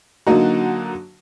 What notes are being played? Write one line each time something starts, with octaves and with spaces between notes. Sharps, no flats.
D3 F#3 A#3 D#4 F#4